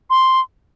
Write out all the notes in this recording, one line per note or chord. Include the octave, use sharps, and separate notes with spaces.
C6